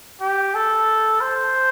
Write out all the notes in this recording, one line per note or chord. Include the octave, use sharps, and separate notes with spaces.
G4
A4
C5